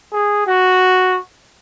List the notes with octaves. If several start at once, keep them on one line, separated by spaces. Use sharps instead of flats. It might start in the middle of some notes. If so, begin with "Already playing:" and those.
G#4
F#4